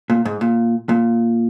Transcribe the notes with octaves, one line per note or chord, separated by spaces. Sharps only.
A#2
G#2
A#2
A#2